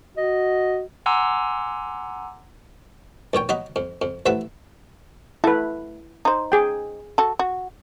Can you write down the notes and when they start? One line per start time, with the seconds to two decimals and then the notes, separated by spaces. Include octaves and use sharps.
0.17 F#4 D#5
1.06 F#5 G#5 A#5 C6 D6 E6
3.34 B1 A#2 C#5 G5
3.49 F#3 D#4 D#5 F#5 B5
3.76 F2
4.02 F2
4.26 A1 F3 B4 E5 F#5
5.44 A3 E4 B4
6.25 D#4 C5
6.52 G#4 G5
7.18 F#4 A4
7.39 F#4